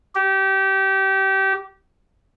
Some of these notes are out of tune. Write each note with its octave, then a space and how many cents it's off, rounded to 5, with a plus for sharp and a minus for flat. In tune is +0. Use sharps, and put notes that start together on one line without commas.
G4 -25